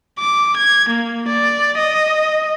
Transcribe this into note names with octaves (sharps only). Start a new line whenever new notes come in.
D6
G#6
A#3
D5
D#5